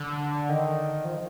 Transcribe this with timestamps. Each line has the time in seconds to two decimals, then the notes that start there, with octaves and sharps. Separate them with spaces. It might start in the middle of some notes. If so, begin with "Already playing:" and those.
Already playing: D3
0.49 D#3
1.05 F3